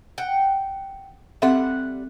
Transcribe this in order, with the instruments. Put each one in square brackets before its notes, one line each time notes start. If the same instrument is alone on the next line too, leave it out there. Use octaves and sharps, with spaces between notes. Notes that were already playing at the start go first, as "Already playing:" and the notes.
[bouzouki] F#5 G5
[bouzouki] G3 F#5 [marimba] C4 A4 E5